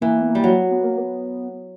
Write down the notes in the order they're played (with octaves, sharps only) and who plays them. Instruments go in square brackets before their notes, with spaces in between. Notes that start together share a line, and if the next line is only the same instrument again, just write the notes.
[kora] E3 [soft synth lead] A#3
[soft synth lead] B3
A#3
[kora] G3
F#3
[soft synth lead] B3
A#3
B3